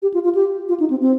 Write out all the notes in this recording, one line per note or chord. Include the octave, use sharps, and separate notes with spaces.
G4
F4
F4
G4
F4
D#4
C4
C4